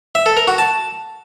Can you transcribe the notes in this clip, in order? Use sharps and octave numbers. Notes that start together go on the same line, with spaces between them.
E5
A4
A#4
F#4
A5